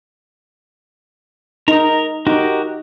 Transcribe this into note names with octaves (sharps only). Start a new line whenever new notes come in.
D#4 A#4 A#5
D#4 F#4 G4 A#4